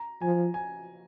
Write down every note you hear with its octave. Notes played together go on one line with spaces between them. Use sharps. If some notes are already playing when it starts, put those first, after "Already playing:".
Already playing: A#5
F3 G#5
G#5